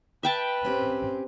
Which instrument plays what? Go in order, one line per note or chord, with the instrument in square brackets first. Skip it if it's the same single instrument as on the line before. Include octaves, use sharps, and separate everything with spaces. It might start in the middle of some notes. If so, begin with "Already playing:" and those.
[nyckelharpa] B4 [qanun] E5 G5 A5
[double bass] C4 [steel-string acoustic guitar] C#4 G4